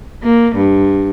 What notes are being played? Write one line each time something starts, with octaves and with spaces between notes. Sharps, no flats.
A#3
G2